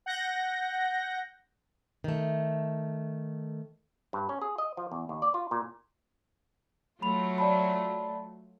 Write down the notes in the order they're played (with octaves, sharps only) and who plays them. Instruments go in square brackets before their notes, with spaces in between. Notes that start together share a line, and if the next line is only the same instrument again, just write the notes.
[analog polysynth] F#5 G6 A#6
[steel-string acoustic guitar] D#3 A3
[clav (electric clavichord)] G2
C#4
G#4
D#5
F3
E2
D#2
D5
F4
A#2
[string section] F#3 A3 F4 [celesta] B5 F7
[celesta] D5 A5 B5